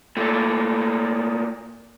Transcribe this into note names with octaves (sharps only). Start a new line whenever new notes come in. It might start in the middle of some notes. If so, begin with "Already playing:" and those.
A#2 A3